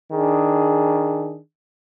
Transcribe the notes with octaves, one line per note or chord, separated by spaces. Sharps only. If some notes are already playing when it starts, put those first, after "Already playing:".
D#3 D4 G#4